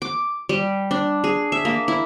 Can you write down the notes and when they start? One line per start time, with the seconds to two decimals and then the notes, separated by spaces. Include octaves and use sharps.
0.02 D6
0.49 G3
0.91 D4
1.24 G#4
1.52 E5
1.65 A#3
1.88 E4